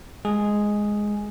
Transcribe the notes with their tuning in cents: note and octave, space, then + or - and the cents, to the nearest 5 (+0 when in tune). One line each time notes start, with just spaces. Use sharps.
G#3 +0 G#4 +0